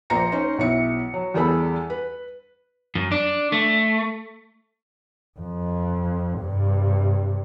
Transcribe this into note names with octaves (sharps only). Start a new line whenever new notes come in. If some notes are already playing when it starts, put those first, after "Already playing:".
A#1 A#3 C5 A#5 A#6 C#7
C#4 D#4 C5
B1 E4 C#7
F#3
E2 G3 G#4 A4 B5
B4
F#2
D4
A3
F2
G2 C3